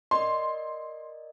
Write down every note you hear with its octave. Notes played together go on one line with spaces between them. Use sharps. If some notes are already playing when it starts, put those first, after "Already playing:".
A#4 D5 D#5 C6